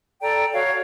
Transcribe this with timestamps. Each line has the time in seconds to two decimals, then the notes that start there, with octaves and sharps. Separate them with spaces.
0.22 A4 D5 G5 A#5
0.53 F#4 C#5 F5